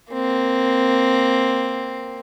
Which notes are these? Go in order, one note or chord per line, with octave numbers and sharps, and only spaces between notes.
A#3 C4